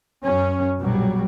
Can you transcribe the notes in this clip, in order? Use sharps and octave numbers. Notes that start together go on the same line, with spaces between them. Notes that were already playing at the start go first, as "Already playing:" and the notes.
F#2 C#4
A#1 B2 F#3 G3